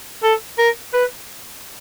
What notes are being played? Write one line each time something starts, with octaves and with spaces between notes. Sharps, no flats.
A4
A#4
B4